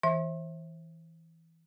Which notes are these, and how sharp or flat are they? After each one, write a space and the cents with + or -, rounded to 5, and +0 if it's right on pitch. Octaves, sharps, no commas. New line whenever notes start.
E3 -10 E5 -5